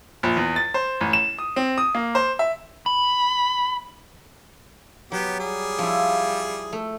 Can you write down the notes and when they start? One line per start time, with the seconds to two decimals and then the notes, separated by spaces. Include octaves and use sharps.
0.23 A#1
0.37 E2
0.56 A6
0.74 C5
1.01 A1
1.13 E7
1.39 D#6
1.56 C4
1.78 D#6
1.95 A#3
2.15 C5
2.39 E5
2.86 B5
5.12 F#3 B3 G4
5.39 G3 G#4
5.79 F3 E4
6.73 A3